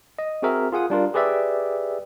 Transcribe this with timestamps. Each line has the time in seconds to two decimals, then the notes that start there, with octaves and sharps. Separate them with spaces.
0.19 D#5
0.42 C4 F#4 G#4 A#4 E5
0.72 F4 G#4 F#5 D#6
0.90 G3 D4 F4 A#4
1.14 G4 G#4 B4 D5 E5 G5